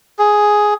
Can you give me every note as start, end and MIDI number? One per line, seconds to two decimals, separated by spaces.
0.19 0.74 68